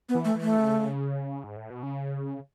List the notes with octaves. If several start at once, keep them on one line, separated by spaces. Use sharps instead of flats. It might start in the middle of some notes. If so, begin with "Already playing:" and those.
B3
E3
A3
E3
A3
C#3
G#2
A2
B2
C#3